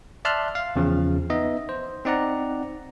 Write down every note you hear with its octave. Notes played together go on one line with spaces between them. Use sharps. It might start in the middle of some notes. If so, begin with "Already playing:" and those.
D5 E5 A5 C6 F6 F#6
F5
E2 C#3 F3
B3 D#4 D#5 E5
C5
C4 D#4 D5 F#5 A#5